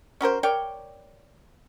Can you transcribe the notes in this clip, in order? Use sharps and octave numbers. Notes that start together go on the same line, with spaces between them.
C#4 F#4 A#4 C5
A#4 C#5 D5 G5